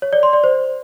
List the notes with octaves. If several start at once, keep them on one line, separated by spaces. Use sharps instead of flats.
C#5
D5
C6
D5
C5